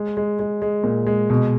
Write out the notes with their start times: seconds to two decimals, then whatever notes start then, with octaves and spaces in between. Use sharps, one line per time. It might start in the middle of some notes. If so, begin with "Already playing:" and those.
Already playing: G#3
0.17 G#3
0.39 G#3
0.62 G#3
0.84 A#2
1.07 G#3
1.30 B2